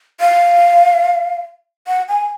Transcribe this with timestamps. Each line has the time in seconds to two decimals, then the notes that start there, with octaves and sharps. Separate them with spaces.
0.20 F5
1.88 F#5
2.09 G#5